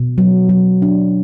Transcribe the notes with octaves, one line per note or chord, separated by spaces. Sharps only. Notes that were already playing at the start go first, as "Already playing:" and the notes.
Already playing: B2
F#3
F#3
D4